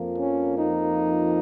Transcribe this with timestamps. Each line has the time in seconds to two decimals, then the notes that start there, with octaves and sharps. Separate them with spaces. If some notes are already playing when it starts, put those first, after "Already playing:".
Already playing: F2 F3 A#3
0.16 C#4
0.57 D#4